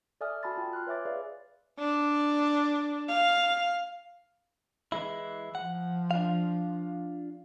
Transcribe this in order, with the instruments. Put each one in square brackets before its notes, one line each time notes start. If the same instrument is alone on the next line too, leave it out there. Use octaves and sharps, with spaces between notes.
[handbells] A4 D5 E5 G#5 D#6 F6
F#4 G#5 A5 B5 C6 A6
F4 G5
C6 F6 F#6
B4 C#5 E5 G#5 D6 A6
G#4 B4 D5 E5 F5
[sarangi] D4
F5
[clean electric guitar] E3 G#3 E4
[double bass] F3 [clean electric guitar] F#5
[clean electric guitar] D4 F4 F5